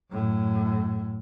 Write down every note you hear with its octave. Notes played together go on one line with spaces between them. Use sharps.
F#2 A2